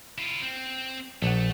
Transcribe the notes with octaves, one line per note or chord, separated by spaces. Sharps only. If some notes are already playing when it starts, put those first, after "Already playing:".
E4 F4
C4
A#1 A3 F#5